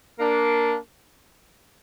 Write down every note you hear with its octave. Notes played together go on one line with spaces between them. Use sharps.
A#3 D4